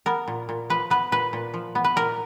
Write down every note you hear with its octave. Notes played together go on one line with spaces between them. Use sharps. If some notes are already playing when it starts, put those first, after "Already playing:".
B3 A#4
A#2
A#2
F3 B4
B3 B4
A#2 B4
A#2
F3
B3
B4
A#2 A#4